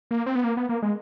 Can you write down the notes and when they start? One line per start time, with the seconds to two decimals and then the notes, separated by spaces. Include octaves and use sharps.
0.11 A#3
0.26 C4
0.35 B3
0.44 A#3
0.57 B3
0.69 A#3
0.82 G#3